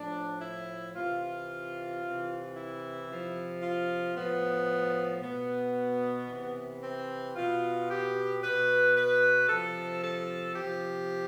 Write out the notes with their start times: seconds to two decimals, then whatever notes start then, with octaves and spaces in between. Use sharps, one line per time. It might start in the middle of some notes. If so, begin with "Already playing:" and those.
Already playing: A2 F3 D4
0.41 E4
0.94 C3 E3 F4
2.02 C3 E3
2.55 E4
3.08 C3 F3
3.62 F4
4.15 A2 F3 B3
5.22 B2 B3
6.28 C3 E3
6.81 C4
7.35 B2 F4
7.89 G4
8.41 B2 B4
8.95 B4
9.48 C3 F3 A4
10.02 A4
10.55 C3 F3 G4